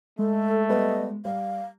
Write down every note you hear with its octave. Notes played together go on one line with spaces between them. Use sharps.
G#3 A3 A4
G3 B3 B4 D#5
G3 F5